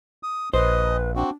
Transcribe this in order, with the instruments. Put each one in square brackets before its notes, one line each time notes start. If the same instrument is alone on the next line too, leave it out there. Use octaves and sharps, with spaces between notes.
[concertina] D#6
[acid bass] A#1 [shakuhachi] B4 [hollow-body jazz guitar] C5 [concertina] D#5
[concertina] C4 F#4 [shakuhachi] D4